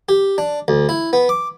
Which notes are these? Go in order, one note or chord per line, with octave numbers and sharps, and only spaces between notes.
G4
D4
D2
E4
B3
D6